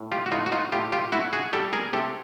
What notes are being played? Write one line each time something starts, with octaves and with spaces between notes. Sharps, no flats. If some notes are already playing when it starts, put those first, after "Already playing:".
Already playing: A2
F4 G4
F#4
A2 D#4 F4
F#4
D#4 F4
A2 F4 G4
F4 G4
A3 E4 F#4
F#4 G#4
G3 G4 A4
G#4 A#4
C3 G4 A4